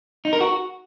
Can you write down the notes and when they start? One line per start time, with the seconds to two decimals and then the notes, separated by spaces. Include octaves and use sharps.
0.25 D#4
0.33 A#4
0.41 F#4